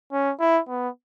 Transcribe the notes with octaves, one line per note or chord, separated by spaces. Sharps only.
C#4
E4
B3